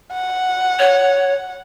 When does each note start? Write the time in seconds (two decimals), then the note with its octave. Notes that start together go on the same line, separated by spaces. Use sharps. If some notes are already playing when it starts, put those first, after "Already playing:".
0.13 F#5
0.79 C#5